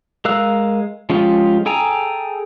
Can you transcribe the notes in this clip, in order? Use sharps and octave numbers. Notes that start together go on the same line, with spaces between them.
G#3 A#4 F5 E6 F#6
F3 G#3 C#4 F4 G4
G#4 A4 G5 G#5 A#5